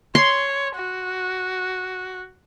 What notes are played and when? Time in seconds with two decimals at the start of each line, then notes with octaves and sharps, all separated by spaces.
0.15 C#5 C6
0.76 F#4